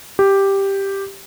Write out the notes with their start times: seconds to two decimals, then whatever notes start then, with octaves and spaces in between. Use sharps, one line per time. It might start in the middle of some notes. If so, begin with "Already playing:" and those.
0.19 G4